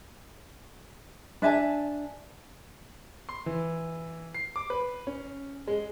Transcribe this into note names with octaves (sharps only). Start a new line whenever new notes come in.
D4 E5 G#5 A5
C6
E3
C7
D6
B4
C#4
G#3